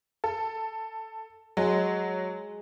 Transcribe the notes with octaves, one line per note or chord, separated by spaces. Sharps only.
A4
F#3 G#3